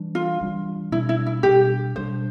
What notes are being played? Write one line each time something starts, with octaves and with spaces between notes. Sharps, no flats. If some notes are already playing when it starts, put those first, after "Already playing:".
Already playing: E3 G3 D4
F4
E3 G3 D4
B2 G3 D4 E4
E4
E4
B2 G3 D4 G4
B2 G3 D4 C5